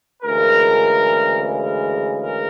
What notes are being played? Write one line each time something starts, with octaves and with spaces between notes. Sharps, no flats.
D2 C#3 E3 G#3 A#4
A#4
A#4